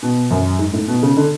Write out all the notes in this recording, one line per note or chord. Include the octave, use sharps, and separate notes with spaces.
B2
F#2
G#2
A2
B2
C#3
D3